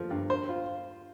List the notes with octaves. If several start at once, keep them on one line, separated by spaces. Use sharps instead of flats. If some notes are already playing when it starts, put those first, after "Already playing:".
Already playing: F3 A3
G2
C5
F4